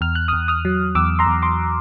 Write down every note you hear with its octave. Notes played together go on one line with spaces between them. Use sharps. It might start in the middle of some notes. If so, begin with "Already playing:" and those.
E2 F6
F#6
E2 D#6 F6
D#6 F6
F#3
E2 D6 E6
A#5 C6
E2
C6 D6